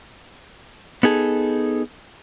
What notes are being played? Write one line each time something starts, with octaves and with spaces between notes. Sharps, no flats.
B3 D#4 G#4 A4